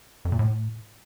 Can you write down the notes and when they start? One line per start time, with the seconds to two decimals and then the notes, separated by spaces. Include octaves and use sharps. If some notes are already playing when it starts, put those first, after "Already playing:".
0.25 F2
0.32 A#2
0.39 A2